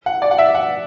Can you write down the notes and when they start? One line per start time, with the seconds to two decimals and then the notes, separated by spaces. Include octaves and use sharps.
0.06 F#5
0.22 D5
0.31 F#5
0.38 E5
0.55 F#5